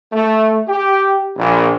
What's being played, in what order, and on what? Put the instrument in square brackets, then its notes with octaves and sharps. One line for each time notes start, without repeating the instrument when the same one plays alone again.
[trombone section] A3
G4
A#1